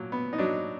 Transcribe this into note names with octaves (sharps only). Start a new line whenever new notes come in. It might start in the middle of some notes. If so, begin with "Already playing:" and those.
Already playing: A#2 F#3
B3
D#4
F#3 D4